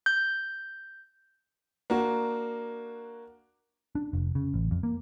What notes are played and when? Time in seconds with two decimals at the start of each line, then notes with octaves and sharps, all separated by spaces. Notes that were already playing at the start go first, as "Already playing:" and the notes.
0.06 G6
1.90 A#3 D4 F#4
3.95 D4
4.13 F1
4.35 C#3
4.54 A1
4.71 F2
4.83 A#3